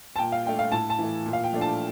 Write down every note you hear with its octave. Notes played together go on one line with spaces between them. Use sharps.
A5
A#2 G5
F5
A3 D4 G5
F5
A2 A5
A5
E3 A3
A#2
F5
G5
F3 A3 D4
A5